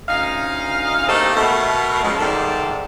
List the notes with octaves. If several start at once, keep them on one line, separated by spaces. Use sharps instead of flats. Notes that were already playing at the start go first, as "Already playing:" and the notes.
D2 C#4 D#4 F5
A3 A#3 C4 D#4 G4 A4
B2 A3 A#4
C#3 F3 F#3 G#3
G#2 C3 D#3 G3 A4